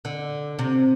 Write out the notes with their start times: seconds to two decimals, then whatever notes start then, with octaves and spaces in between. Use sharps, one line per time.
0.05 D3
0.59 C3